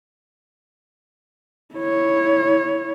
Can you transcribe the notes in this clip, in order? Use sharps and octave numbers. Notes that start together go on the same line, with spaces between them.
E4 C#5